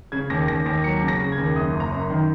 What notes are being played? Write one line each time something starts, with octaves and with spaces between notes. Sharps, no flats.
C#3 G#6
D#2 A#6
D#2 A#6
D#2 A#6
F#3 C#7
C#3
A#6
C#3
G#6
D#2
F#2 D#6
F#1
A#5
F#2
D#3